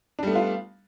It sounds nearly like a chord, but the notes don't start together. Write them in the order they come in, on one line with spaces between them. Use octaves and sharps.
D4 G3 A3 B3 F4